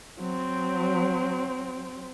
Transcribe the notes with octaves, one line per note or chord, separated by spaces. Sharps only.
F#3 C4